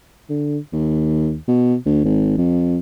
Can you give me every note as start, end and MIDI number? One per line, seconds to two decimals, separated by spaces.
0.29 0.58 50
0.73 1.36 39
1.48 1.76 47
1.86 2.00 38
2.05 2.36 32
2.38 2.79 41